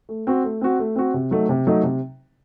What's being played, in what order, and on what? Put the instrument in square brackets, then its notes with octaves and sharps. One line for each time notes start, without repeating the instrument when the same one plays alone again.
[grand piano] A3
C4 F#4
A3
C4 F#4
A3
C4 F#4
C3
F#3 A3 D#4
C3
F#3 A3 D#4
C3